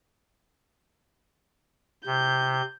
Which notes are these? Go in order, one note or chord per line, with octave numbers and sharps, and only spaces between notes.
C3 G6